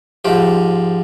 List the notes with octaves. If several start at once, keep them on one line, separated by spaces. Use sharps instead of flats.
G#2 F3 G4